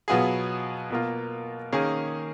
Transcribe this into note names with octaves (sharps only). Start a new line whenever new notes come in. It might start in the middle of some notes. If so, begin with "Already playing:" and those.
B2 F#3 B3 F4 G#4
B2 A#3 F4
D#3 A#3 C#4 G#4